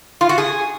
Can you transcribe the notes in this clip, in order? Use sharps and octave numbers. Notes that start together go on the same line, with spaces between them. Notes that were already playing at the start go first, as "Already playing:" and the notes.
F4
F#4
G#4